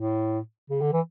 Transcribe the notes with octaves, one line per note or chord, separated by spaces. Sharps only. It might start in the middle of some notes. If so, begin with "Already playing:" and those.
Already playing: A2
C#3
D3
E3